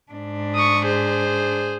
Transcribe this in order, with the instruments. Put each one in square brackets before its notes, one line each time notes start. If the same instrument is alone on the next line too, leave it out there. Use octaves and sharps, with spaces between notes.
[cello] G#2 D4
[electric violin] C#6 D#6
G#4 C5